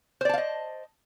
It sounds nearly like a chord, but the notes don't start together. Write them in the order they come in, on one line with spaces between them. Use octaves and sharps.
C5 D5 A5 F5 D#5